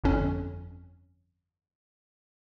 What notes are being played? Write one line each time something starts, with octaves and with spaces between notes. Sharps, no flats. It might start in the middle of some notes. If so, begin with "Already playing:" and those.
G1 F2 C#4